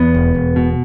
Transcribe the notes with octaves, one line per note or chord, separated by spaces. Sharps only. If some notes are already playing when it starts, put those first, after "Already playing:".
Already playing: E2 B3
E1
E1
B2